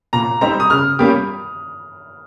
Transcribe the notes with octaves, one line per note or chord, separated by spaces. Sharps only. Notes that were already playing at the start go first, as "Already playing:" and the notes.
A#2 A#5
G3 C4 D#4 G4 A#5
D#6
C#3 F6
G3 A#3 C#4 G4